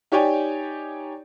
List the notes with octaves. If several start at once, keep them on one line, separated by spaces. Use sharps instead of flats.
D#4 G4 C#5 D5 G5 G#5